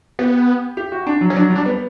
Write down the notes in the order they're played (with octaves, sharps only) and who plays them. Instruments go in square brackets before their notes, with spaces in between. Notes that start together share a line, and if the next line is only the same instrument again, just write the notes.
[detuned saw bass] B3 [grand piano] G4
[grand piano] G4
F#4
D4
F#3
[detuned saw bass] C#4
[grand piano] F#3 [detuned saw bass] D4
[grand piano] G3
[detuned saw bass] D4
[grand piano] B3